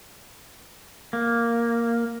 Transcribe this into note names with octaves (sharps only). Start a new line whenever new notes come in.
A#3